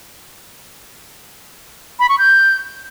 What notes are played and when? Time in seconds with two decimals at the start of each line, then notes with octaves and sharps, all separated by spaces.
1.99 B5
2.09 C#6
2.19 G6